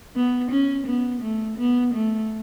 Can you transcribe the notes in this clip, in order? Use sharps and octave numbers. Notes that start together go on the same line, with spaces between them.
B3
C#4
B3
A3
B3
A3